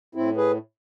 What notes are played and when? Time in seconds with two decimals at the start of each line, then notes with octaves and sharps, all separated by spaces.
0.15 A2 C4 E4
0.37 G#4 B4